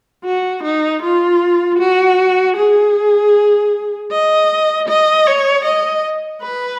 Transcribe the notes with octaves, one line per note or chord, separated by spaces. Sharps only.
F#4
D#4
F4
F#4
G#4
D#5
D#5
C#5
D#5
B4